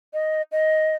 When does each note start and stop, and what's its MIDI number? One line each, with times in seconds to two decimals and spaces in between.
0.13 0.42 75
0.52 0.96 75